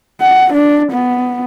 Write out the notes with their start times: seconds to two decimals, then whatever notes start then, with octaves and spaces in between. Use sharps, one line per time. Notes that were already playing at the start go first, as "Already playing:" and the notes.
0.21 F#5
0.54 D4
0.92 B3